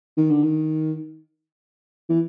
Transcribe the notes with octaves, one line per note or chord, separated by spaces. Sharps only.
D#3
D3
D#3
E3